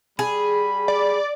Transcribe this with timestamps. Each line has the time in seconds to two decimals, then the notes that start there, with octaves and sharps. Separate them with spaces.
0.19 G3 G#4 B5
0.88 D5